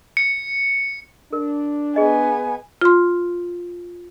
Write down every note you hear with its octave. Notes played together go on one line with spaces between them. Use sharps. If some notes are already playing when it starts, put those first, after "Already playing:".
C#7
D4 A#4
B3 G#4 D#5 G#5
F4 C6